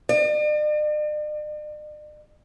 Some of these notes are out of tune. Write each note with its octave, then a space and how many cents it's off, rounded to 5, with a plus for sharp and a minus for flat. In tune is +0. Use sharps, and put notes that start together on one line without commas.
D5 +45